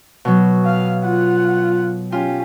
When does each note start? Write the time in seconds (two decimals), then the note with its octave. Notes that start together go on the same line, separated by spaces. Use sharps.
0.25 B2 F#3
0.65 F5
1.04 F4 F#5
2.12 C#4 F4 G4